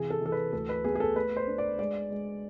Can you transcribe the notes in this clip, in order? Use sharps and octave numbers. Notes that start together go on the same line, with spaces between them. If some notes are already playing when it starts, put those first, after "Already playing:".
Already playing: C3 E3 G#4
A4
E3 A4
B4
D2 A4
B4
B3 G#4
G#4
A4
A3 B4
C5
D4
D5
G#3 D5
G#3